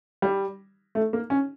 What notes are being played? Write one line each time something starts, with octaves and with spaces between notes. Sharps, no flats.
G3
A3
A#3
C#4